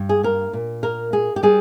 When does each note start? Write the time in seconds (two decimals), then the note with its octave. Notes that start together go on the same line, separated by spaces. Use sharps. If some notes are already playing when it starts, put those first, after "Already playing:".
Already playing: G2
0.09 G#4
0.23 A#3 A#4
0.53 A#2
0.83 A#3 A#4
1.13 A#3 G#4
1.36 G4
1.43 G3 G#4